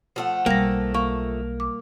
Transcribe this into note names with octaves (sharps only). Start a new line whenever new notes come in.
F3 A3 F#5
B1 G3 A#3 A#6
A#3 C#6
D6